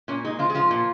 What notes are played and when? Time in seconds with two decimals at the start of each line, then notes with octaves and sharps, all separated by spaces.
0.08 A#2 C#4
0.24 G#3 D#4
0.39 F3 F4
0.50 G#4
0.55 F3 F4
0.71 A#2